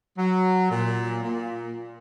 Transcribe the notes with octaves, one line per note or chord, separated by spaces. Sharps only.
F#3
A#2
A#2